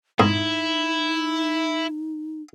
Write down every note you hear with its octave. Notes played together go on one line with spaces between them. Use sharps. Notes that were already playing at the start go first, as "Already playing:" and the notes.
G#2 D#4 E4